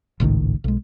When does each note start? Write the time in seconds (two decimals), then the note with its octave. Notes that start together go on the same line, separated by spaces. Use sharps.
0.20 G#1 C#2 A2 D#3
0.64 B1 G#3